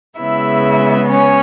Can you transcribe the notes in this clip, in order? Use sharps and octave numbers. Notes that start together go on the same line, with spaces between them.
C#3 G#3 B3 E4 E5
C#4 C#5